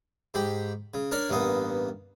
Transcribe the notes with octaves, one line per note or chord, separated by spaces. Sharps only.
G#2 G4 B5
C#3
D4 A#4 C#5 D5
A1 G2 A#3 B3 D#6